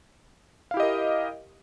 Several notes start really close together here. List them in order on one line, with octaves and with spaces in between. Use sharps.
F5 E4 G4 D#5 A#4